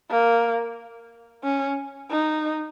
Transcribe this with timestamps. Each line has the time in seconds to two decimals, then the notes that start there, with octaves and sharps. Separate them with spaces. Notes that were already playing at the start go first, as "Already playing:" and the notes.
0.11 A#3
1.44 C#4
2.10 D#4